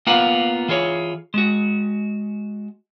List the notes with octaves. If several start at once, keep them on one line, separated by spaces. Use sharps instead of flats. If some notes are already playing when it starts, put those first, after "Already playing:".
A#3 B3 F4 F#5
E3 F4 G#4 C#5
G#3 F#4